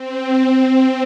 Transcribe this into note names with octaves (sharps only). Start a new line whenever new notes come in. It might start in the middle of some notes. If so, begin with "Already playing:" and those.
Already playing: C4